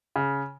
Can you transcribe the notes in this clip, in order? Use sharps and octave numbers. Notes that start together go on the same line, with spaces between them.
C#3